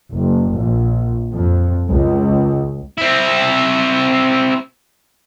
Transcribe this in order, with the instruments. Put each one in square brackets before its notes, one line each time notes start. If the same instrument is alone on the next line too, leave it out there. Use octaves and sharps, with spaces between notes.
[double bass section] F#1
A#1
F2
C#2
[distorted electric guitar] C4 E4